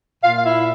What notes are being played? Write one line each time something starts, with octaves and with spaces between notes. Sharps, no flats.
A#2 F4 F5
F5
E4 E5